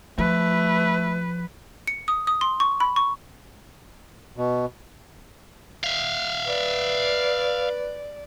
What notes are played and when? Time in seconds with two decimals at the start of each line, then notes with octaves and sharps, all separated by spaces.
0.18 F3 A3 B4
1.87 C#7
2.08 D#6
2.27 D#6
2.41 C6
2.60 C#6
2.80 B5
2.96 C#6
4.37 B2
5.84 E5 F5
6.46 B4 D5